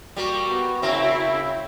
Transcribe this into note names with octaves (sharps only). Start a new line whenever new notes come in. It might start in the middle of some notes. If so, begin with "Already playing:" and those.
G3 A#3 F#4
B3
C#3 C4 E4 A#4 E5